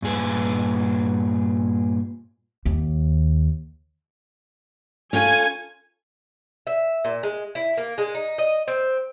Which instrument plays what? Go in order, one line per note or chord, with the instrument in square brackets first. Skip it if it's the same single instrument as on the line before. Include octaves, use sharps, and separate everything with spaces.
[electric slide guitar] G2 A#2 G#4 B4
[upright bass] D#2
[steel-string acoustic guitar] C#4 F4 A4 [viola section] G#5
[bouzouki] E5
A#2
G#3
E4
A#3
G#3
D#4
D#5
C4